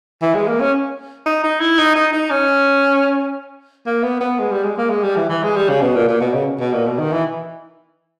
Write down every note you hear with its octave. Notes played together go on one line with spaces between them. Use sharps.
E3
G#3
A#3
C#4
D#4
D#4
E4
D#4
D#4
D#4
C#4
A#3
B3
B3
G#3
G3
G#3
A#3
G#3
G3
E3
E3
G#3
G3
C#3
B2
A#2
A#2
B2
C#3
B2
A#2
B2
D#3
E3